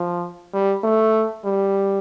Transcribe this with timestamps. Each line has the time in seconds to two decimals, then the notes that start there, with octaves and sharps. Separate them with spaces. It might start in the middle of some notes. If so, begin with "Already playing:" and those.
Already playing: F3
0.54 G3
0.83 A3
1.45 G3